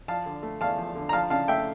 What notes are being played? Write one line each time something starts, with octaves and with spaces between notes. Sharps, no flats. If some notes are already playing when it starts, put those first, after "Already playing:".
F3 F5 A5
D3
A3
E2 F5 A5
F3
D3
A#5
F3 F5 A5
C#3 F5 A5
A3 E5 G5